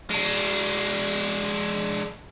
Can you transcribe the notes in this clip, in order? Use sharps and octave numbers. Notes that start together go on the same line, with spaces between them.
G#3 D4